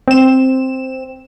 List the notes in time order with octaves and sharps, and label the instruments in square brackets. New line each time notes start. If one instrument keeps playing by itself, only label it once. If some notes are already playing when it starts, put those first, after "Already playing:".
[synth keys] C4 E7